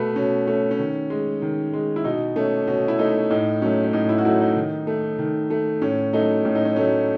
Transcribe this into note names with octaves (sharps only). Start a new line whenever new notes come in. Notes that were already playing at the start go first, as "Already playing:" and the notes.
Already playing: B2 A3 B4
B2 C#4
A3 C#4
C#4
D#3
G#3
D#3
G#3
E4
B2 D#4
A3 C#4
B2 C#4
E4
A3 D#4
A2 D#4
F#3 A3 C#4
C#4
A2 D#4
E4
F#4
F#3 A3 E4
D#4
D#3
A3
D#3
A3
A2 C#4
F#3 A3 D#4
A2 C#4
D#4
C#4
F#3 A3 C#4